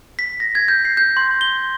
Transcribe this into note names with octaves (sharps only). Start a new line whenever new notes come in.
B6
A#6
G#6
G6
C7
G6
C6
G7